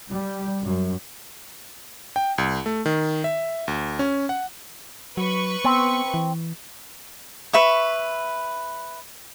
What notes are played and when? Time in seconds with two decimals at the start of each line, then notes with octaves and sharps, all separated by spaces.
0.10 G3
0.63 F#2
2.16 G5
2.38 C2
2.66 A3
2.86 D#3
3.24 E5
3.68 D2
3.99 C#4
4.29 F#5
5.17 F#3 B4 C#6
5.65 B3 C4
6.14 E3
7.53 B4 E5 C#6